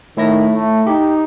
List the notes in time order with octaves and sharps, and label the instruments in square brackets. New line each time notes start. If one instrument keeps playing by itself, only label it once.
[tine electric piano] A2 E4 A#6 [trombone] D#3
[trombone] A3
[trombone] D#4 [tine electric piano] G4